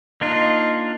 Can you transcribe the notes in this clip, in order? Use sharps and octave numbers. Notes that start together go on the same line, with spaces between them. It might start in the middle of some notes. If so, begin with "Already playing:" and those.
A#3 D4 D#4 F4